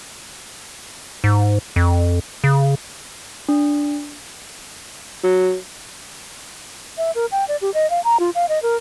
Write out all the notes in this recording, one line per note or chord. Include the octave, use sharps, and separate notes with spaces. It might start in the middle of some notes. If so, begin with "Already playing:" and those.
G#2
F2
C#3
D4
F#3
E5
A#4
G5
D5
G4
D#5
F5
A#5
F4
F5
D#5
A#4